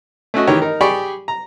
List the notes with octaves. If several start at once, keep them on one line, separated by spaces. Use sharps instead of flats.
A3 C#4 F#4 D#5
D#3 E3 G4 A#4 C#5
D#4 A#4
G4 G#4 D5 B5 C#6
A#5